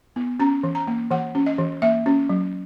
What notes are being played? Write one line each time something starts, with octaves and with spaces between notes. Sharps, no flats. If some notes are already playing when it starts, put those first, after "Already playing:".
B3
C#4 A#5
E3
A#5
A#3
E3 F#5
C#4
D#5
E3
A#3 E5
C#4
F#3